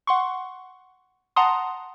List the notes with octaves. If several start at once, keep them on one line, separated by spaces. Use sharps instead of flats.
F#5 C6 C#6
F#5 A5 A#5 C6 D#6